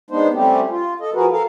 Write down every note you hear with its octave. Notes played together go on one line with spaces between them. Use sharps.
G#3 B3 D4 D#4 C5
G3 A3 C4 C#4 G4
F4
A4 D#5
F3 F#4 G#4 A#4 B4
A4 A#4 F5